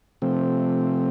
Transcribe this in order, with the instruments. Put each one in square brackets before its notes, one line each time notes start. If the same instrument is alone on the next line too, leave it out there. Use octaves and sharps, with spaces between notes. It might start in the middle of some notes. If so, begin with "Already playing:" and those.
[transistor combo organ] C3 F3 A3 C4